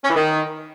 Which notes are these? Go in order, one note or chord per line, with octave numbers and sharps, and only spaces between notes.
C#4
E3
D#3